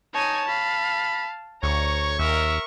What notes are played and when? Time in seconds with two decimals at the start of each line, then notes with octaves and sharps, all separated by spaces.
0.14 D#4 C#5 G#5 A5
0.48 F5 B5
1.63 D2 C#5 A#5 C#6
2.19 D#2 A#4 E5